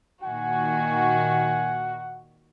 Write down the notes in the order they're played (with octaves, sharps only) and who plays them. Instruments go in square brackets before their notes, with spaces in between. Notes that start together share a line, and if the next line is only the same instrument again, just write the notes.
[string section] A#2 D#3 F#4 [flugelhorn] F#5 [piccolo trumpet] G#5